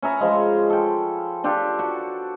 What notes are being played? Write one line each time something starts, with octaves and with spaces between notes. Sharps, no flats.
C#4 B4 E5 A#5
F3 G#3
A4 G5
D4 F4 G4 A4
F#4